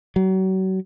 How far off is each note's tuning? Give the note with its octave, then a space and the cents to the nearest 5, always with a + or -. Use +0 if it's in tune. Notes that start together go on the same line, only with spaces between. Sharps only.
F#3 +35